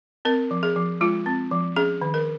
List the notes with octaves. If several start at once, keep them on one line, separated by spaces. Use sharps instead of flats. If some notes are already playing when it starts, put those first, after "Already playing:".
C4 A#4
F3
G#4
F3
G#3 F4
C4
F3
C#4 G#4
D#3
A#4